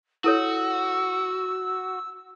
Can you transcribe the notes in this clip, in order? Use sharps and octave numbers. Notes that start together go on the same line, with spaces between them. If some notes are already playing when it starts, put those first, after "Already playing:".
E4 F#4 A4 C#5 E6